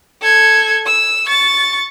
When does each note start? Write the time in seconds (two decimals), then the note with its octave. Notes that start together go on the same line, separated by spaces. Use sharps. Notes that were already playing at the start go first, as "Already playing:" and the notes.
0.22 A4 G#6
0.86 E6
1.26 C#6 A6